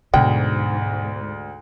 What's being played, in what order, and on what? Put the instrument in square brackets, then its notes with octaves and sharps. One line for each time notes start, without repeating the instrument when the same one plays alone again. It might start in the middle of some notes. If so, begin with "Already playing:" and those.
[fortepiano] D2 [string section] G#2 [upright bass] B2 [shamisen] G5